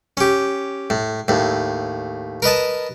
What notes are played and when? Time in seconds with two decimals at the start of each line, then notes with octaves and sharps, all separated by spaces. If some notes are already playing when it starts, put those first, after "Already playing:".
0.17 C#4 G4
0.90 A2
1.28 D#2 A2
2.42 A#4 B4 D#5 A5